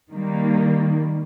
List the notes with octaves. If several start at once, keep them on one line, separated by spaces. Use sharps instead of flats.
D#3 G3 A#3